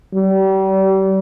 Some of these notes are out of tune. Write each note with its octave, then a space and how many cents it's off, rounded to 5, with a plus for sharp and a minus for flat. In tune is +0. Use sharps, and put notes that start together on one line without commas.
G3 -35